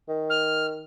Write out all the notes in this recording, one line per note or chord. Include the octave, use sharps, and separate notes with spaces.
D#3
F6